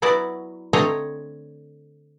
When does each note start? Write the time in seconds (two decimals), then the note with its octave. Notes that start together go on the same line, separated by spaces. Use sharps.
0.02 F#3 B3 E4 F#4 D5
0.73 D3 A3 C4 C#5 D#5 A#5